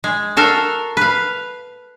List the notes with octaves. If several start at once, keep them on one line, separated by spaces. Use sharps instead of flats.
G#3
F#4 A4 A#4 F5
B4 F5